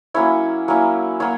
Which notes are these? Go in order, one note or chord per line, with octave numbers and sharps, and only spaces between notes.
F#3 A#3 C#4 E4 C#5
F#3 A#3 C#4 E4
F#3 A#3 C#5